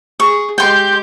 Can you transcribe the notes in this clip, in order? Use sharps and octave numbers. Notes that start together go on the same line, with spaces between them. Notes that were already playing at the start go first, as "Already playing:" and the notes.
G#4 C#6
G#3 G4 G5 C6 G6